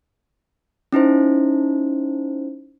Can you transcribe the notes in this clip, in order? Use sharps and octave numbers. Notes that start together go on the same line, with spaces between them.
C#4 D#4 E4 C5